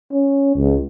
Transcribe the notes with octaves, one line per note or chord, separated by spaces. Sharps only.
C#4
C#2